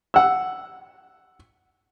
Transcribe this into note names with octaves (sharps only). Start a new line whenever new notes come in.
F#5 E6